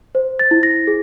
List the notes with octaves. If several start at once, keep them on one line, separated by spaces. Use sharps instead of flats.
C5
A6
E4
A#6
G#4